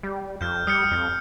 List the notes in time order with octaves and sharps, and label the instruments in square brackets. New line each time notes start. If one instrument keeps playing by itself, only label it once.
[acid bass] G3
[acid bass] F2 [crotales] F6 G6
[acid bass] G3 [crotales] D#6 F6 C#7
[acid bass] F2